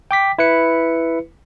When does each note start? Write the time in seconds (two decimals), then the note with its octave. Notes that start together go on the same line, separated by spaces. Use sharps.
0.11 G5 D6 B6
0.38 E4 B4 C#7